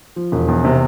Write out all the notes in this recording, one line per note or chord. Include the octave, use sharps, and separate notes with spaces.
F3
E1
E2
C3